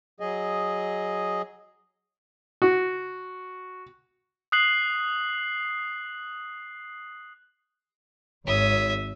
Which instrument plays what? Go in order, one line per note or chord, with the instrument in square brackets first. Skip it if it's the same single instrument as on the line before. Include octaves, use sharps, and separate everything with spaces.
[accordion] F#3 G#4 D#5
[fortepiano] F#4
[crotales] D#6 F#6 C7 F#7
[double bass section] G#1 [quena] C#5 [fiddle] E5 D#6